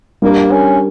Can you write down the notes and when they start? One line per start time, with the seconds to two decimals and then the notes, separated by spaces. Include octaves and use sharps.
0.22 G3 A#3 D4 G4 A#4
0.52 C#4